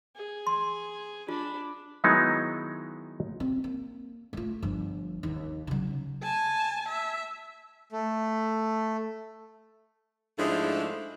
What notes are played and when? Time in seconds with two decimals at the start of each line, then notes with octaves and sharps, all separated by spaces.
0.16 G#4
0.47 C6
1.29 D4 F4 B5
2.04 D#3 F#3 G#3 B3 D#4 E4
3.40 C4
3.64 A#3
4.33 A3 F4
4.63 G1 F3
5.23 D#2
5.67 C#3 F#3
6.23 G#5 A5
6.89 E5
7.92 A3
10.39 G#2 F3 G#3 A3 D4 E4